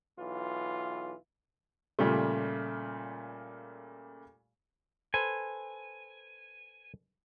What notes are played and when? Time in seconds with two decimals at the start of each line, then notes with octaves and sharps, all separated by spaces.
0.18 B1 E3 F4
1.99 A#2 C#3 G3 A3
5.14 A4 B4 C5 G#5